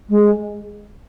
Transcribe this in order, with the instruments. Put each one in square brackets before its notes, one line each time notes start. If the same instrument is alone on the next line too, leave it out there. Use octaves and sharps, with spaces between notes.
[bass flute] G#3